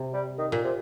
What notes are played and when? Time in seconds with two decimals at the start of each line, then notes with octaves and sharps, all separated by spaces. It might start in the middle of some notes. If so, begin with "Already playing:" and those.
Already playing: C3
0.13 G3
0.38 D#3
0.52 A#2
0.64 C3